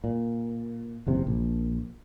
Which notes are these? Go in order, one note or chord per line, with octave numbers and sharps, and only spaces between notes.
A#2
F#1 E2 C3
A#1